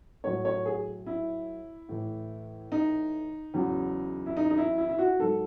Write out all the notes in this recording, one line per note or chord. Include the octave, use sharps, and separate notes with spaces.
A2 F#3 C#5
C#5
G#4
E4
A2 E3
D#4
E2 C#3 F#3
E4
D#4
D#4
E4
E4
E4
F#4
G#2 F#3 A4